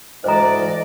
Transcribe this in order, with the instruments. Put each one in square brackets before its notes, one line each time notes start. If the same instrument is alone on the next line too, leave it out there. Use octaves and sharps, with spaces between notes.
[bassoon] D2 [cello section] G#2 E3 D5 [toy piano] C5 A#5 [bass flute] D#5